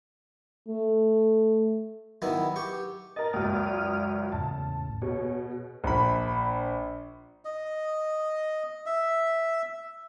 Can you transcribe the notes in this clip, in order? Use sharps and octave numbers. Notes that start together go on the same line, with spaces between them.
A3
D#3 F#3 B3 E4
G4 C#6
A#4 D#5 A6
C#2 F#2 D5 D#6 F6
E2 A2 C#3 A5
B2 G#4 C#5
A#1 B5
D#5
E5